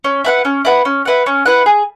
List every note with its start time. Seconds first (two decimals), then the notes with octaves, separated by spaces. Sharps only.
0.04 C#4
0.25 E4 B4 F#5
0.45 C#4
0.65 E4 B4 F#5
0.85 C#4
1.05 E4 B4 F#5
1.26 C#4
1.46 E4 B4 F#5
1.66 G#4